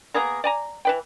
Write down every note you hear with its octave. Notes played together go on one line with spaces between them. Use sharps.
A#3 B3 G#4 A#4
D5 G#5 A#5
E3 B4 G5